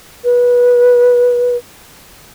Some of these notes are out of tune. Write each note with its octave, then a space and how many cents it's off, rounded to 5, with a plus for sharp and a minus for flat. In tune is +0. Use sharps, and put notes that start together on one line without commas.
B4 -20